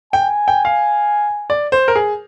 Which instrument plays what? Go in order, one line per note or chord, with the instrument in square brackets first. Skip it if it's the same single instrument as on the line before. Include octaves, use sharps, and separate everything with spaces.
[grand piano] G5 [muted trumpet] G#5
[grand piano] G5
F5
D5
C5
A#4
G#4